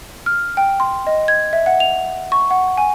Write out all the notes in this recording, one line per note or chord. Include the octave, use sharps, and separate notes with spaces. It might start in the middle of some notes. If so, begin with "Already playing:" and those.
F6
G5
C6
D#5
G#6
E5
F#5
F7
C#6
F#5
G#5